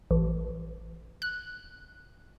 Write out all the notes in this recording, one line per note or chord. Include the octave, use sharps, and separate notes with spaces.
A1
F#6